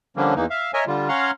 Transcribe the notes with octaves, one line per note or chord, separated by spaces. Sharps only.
D3 F3 G3 A#3 C#4 D4
E2 E3 A#3 D#4
E5 F5
A#4 C#5 D#5 E5 G#5
D3 G3 F4
C#4 C#5 F5 F#5 A#5 C6